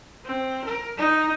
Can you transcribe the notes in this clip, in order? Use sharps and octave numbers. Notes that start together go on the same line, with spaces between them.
C4
A#4
D#4